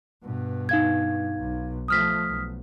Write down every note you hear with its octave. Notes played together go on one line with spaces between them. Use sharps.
G2 B2
D#4 F5 G#6
B1
F3 A3 D#6 F6 B6
B1